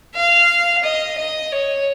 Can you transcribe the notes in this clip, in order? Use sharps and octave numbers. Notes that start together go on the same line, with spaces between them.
F5
D#5
D#5
C#5